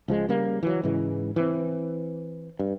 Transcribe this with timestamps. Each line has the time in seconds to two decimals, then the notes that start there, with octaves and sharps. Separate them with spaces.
0.08 C#2 F3 G#3
0.29 C#3 G3 A#3
0.63 E3 F#3
0.83 G#2 C#3 E3 G#3
1.36 E3 C4
2.59 G2